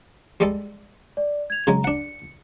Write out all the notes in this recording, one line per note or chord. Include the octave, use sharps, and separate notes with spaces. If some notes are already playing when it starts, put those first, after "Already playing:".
G3 G#3 A4
D5
G#6 F7
C#3 F#3 G#3 A#5
D4 F#5 C#7